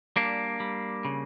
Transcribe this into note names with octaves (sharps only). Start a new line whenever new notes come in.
G3 A#3 D4
G3
C#3